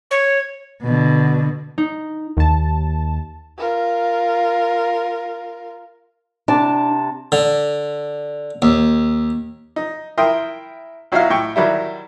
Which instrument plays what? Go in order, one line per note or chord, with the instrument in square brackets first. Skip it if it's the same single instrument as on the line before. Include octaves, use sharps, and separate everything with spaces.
[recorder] C#5
[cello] B2 D3
[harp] D#4
[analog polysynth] D#2 A5
[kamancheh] F4 A#4
[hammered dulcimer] C3 [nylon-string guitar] D4 [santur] A5
[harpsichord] D3
D#2
[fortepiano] D#4
E4 A#4 G5 C6 D#6
B1 F#3 D#4 E4 F5 F6
A2 G5 C#6
D#3 F#3 G3 E4